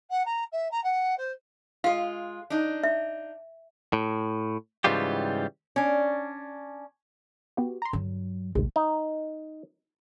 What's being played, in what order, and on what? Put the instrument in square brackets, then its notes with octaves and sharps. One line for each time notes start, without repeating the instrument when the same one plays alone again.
[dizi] F#5
A#5
E5
A#5
F#5
C5
[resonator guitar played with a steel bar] G#3 F4 [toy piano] F5
[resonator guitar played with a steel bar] D4 D#4
[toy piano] E5
[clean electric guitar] A2
G#2 C#3 E3 G3 F4 G4
[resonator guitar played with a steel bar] C#4 D4
[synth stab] B3 F#4 G4
A#5 C6
[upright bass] G2 F#3 [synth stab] D3
[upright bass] A#1 C3 [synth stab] D#2 G#3
[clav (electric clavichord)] D#4